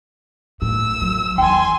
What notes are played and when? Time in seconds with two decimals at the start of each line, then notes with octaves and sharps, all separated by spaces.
0.62 A2 E6
1.02 F#3
1.38 E2 E3 G5 G#5 C6